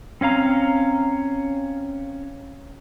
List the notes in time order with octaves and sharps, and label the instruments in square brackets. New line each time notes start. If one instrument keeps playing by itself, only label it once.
[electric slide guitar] C4 C#4 F5 A#5